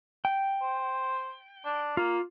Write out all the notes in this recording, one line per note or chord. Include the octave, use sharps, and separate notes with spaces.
G5
C5
D4
A#3 F4